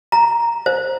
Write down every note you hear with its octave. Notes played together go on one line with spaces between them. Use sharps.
A#5
C5